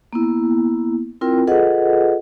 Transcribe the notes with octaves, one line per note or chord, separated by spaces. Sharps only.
A#3 B3 E4
C4 E4 F4 A#4 G5
F4 G#4 A4 B4 D#5 F#5